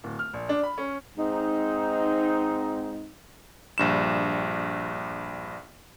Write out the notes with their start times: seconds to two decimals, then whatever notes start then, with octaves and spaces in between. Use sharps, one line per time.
0.04 D1
0.19 F6
0.34 A#1
0.49 D4
0.63 B5
0.78 C#4
1.17 G#2 C4 D#4
3.78 A#1 G2 E7